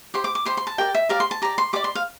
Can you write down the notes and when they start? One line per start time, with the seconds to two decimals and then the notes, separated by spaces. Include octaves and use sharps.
0.14 G4 C5 C6
0.24 D6
0.35 D6
0.45 G4 C5 C6
0.57 C6
0.67 A5
0.78 G4 A#4 D5 G5
0.95 E5
1.09 G4 A#4 D5 F5
1.20 C6
1.31 A5
1.42 G4 D5 A#5
1.58 C6
1.73 G4 D5 D6
1.84 C6
1.95 F5